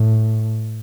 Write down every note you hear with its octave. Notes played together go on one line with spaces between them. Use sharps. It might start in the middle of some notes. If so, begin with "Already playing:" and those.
Already playing: A2